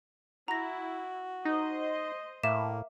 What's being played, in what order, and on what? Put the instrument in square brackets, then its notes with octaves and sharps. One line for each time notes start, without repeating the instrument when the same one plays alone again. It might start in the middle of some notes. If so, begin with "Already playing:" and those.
[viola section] E4 [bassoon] F#4 [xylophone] A#5 A#6
[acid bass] D#4 [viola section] C5 D#5
[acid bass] A2 [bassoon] A#3 [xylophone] E5 D6 E7